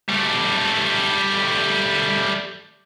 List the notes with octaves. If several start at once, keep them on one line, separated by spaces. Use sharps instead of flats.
G3 A3